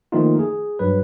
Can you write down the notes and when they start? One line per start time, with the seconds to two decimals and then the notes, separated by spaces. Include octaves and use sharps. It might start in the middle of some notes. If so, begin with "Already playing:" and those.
0.12 D#3 F3 A3 A#3 D#4 F4
0.39 G#4
0.79 G2 F#3 B4